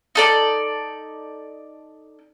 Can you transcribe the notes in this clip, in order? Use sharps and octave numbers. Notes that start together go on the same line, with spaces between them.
D#4 A4 D5